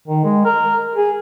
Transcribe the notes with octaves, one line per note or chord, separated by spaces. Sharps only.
D#3
G#3
A#4
G#4